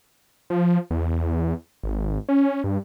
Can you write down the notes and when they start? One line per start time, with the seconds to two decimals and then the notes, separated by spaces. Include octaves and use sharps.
0.50 F3
0.90 E2
1.83 G#1
2.29 C#4
2.64 G2